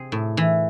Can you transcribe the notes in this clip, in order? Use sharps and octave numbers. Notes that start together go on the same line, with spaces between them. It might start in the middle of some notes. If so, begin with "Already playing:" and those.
Already playing: C3 C4 G#4
A2
E3